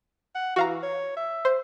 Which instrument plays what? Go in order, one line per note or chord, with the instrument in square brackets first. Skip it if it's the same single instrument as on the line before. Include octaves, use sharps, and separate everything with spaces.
[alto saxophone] F#5
[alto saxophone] E3 [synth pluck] F#4 F5 A#5
[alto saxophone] C#5
E5
[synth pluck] C5